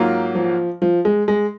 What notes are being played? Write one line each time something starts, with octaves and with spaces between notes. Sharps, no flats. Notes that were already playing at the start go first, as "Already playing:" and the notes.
Already playing: G#2 F#3 A#3 F4
F3
F3
G#3
G#3